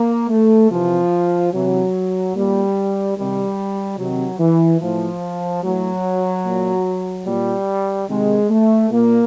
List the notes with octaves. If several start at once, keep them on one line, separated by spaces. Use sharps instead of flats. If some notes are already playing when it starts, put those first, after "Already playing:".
Already playing: A#3
A3
C3 E3 F3
C3 E3 F#3
A#2 G3
C3 D#3 G3
C3 D#3 F#3
E3
A2 E3 F3
A2 E3 F#3
A#2
A#2 G3
C3 D#3 G#3
A3
A#2 A#3